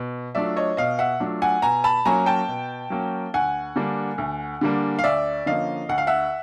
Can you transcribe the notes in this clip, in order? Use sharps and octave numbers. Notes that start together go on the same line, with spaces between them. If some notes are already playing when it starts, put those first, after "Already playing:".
Already playing: B2
F#3 A3 D4 F4 D5 E5
C#5 D#5
B2 D#5 F5
E5 F#5
F#3 A3 D4 F4
F#5 G#5
B2 G#5 A#5
A5 B5
F#3 A#3 C#4 G#5 A#5
G5 A5
B2
F#3 A#3 C#4
D2 F#5 G#5
D3 G3 A#3 D4
D2
D3 G3 A#3 D4
F5
D2 D5 E5
D3 F3 A#3 C#4 D#5 F5
D2 F#5
F5
E5 F#5